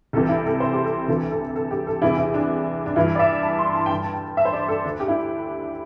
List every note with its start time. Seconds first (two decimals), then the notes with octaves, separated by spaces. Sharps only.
0.13 C2 C3 E3 A4
0.29 E4
0.46 A4
0.60 C5
0.73 G4
0.85 A4
1.08 D2 C3 E3 A4
1.31 A4
1.56 A4
1.71 G4
1.87 A4
2.02 E2 C3 E3 E4
2.17 E4
2.34 D4
2.86 D4
2.96 G2 E3 E4
3.15 D5
3.19 E5
3.43 A5
3.59 C6
3.75 A5
3.86 G5
3.90 G2 D3 A5
4.03 A5
4.13 G5
4.37 E5
4.45 C5
4.53 D5
4.68 A4
4.84 D2 D3 D4
5.00 G4
5.08 E4